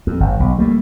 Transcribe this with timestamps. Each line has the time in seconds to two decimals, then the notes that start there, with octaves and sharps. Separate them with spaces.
0.07 F2
0.20 G1
0.40 B1
0.58 G3 A3 A#3